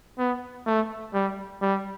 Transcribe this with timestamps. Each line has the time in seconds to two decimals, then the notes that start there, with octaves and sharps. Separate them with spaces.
0.18 B3
0.66 A3
1.13 G3
1.61 G3